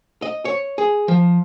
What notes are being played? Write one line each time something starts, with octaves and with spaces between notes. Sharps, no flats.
D#5
C#5
G#4
F3